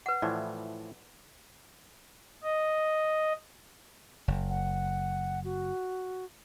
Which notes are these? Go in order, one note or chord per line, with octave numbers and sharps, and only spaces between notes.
B4 F#5
A2 E3 F3 D5
D#5
F#1
F#5
F#4